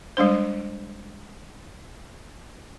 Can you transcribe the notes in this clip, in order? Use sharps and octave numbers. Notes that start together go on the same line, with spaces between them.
G3 G#3 D4 C5